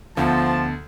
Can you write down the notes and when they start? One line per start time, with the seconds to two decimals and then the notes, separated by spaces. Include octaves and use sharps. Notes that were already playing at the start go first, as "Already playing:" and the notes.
0.17 D2 F3 B3 A5